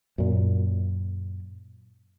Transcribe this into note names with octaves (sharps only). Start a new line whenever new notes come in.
F#2 A#2